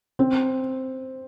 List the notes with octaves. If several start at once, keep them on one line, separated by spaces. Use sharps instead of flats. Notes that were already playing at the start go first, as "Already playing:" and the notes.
C4